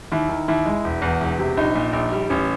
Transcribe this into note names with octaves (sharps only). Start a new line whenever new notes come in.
D#2 E4
D#3
D#2 E4
G#3
E1
E2
E1
C3
A#1 D#4
A#2
A#1
G3
A1 C#4